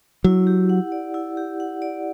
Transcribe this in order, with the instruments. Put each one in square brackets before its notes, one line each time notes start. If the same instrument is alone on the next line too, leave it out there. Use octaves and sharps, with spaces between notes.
[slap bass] F#3 [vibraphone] E4
[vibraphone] G4
F#5
D5
E4
G4
F#5
D5